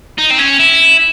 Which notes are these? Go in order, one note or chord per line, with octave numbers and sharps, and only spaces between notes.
D#4
C4
C#4
E4